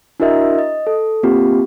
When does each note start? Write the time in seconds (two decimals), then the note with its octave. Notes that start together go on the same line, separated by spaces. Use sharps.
0.20 D4 E4 F#4 A#4 D#5 E5
0.59 D#5
0.87 A4
1.23 A#3 C4 F4 G4